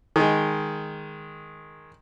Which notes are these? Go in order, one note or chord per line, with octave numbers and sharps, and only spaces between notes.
D#3 G#3